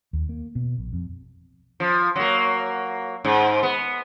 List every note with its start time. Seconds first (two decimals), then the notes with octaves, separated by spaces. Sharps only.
0.13 D#2
0.29 A#3
0.55 B2
0.78 A#1
0.93 F2
1.80 F3
2.16 F#3 A#3
3.25 G#2
3.63 B3